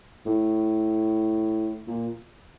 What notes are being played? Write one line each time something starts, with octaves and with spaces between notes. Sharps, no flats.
A2
A#2